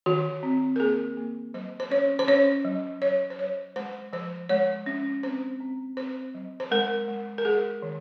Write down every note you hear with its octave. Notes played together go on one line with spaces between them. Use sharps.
D#3 F#4
C4
A#4
A#3 G#4
A#3
F#3 C5
C5
C#4 C#5
C5
C#4 C#5
F#3
F#3 C#5
C5
F#3 C#5
G#3 C5
F3 C5
G#3 C#5
C#4
C4 C5
C4
C4 C5
F#3
C5
G#3 A#4
G#3
A#4
G#3 G#4
D#3